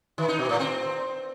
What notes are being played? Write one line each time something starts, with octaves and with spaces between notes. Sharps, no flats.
D#3
D#4
B2
A2
C4